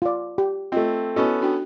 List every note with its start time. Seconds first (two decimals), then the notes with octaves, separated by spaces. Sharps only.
0.02 F4 D5
0.38 G4
0.72 A3 C4 F4 D#5
1.16 B3 C#4 E4 F#4 A4 D#5
1.42 D4 F#4 G5